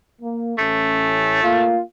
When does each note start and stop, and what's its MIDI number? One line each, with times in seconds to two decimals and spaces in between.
0.21 0.53 58
0.58 1.40 33
0.58 1.72 57
0.58 1.40 61
1.44 1.81 58
1.44 1.81 65